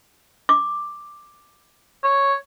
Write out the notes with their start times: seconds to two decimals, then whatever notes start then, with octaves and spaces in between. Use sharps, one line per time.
0.49 D6
2.03 C#5